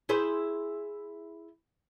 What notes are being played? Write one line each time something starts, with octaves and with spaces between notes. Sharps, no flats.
E4 G#4 C5